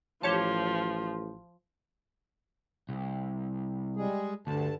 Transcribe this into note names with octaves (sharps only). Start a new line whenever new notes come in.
A1 F3 G4 C#5 A5
C2
G3 G#3 G#4
D2 G2 D3 A5